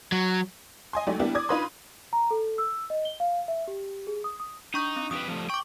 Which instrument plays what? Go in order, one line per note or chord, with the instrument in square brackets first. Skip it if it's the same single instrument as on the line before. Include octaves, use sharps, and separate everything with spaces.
[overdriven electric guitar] F#3
[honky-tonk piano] D#5 G#5 C6
F#3 G#3 A3 D#4 G4 D5
G3 A#3 B3 D4 E4 G4
D5 D6 D#6 G#6
D4 D#4 F4 B4 B5 C6
[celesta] A#5
A4
E6
D#5
G7
F5
E5
G4
G#4
D#6
D#6
[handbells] D4 C#6 G6 [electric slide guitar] D#4
[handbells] C4
[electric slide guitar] F2 G4 B4 [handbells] D#6
[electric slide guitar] F3 G3 A3
[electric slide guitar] G5 [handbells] C#6 D6